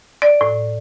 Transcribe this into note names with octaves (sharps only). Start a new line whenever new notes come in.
D5
A2